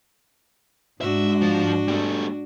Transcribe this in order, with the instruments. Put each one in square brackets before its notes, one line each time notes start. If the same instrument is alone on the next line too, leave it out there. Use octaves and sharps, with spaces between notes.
[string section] G#2 [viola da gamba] D4 F#4 [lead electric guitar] E5
[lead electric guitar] F3
G3 A3